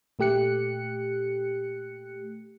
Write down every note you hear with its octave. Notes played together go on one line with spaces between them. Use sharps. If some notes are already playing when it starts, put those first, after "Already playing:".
A#2 A3 G4 F#6 C#7